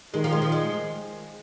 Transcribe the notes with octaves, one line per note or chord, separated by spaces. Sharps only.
D#3 G#3
F3
G#3
F3
G#3